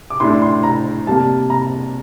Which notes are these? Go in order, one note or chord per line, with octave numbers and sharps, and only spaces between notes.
D6
A2 A3 D4 C6
C6
A#5
C3 G3 A#3 A5
A#5